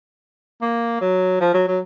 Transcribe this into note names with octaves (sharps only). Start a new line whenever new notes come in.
A#3
F#3
F3
F#3
F#3